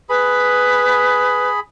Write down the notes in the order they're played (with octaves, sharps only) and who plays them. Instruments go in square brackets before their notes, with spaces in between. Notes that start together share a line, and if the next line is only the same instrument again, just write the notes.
[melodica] G#4 B5 [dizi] B4